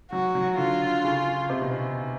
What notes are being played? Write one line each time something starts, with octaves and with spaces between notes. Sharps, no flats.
F#3 F#4
F#3
D3 F4
C#3
C3
B2